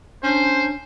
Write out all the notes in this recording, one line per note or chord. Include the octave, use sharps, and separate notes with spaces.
C#4 D4 C5